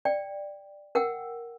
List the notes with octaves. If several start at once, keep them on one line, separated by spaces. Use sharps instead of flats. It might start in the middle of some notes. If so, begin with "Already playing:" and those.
D5 G5
A#4 F#5 G5 E6